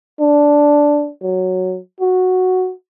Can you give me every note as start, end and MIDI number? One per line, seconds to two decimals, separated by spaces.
0.20 1.10 62
1.22 1.78 54
2.00 2.72 66